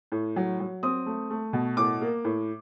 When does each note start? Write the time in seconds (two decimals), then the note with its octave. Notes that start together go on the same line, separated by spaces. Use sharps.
0.12 A2
0.36 F#3
0.60 F#3
0.83 C4 D#6
1.06 A3
1.30 A3
1.53 B2
1.77 A2 D6
2.01 A#3
2.25 A2